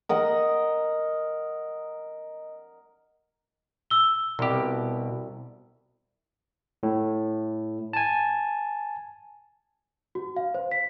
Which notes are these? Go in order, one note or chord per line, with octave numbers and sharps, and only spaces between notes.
A#4 D#5 F#5
E6 G7
C2 B2 G4
A2
G#5 A5
F#4
F5
C5
B6